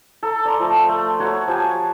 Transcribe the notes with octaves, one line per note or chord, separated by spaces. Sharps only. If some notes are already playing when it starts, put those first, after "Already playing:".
A4 A#5
D5 A#5 C6
F3 A3
A3
F#4 C#5 A#5
F3 G4 G#5 A5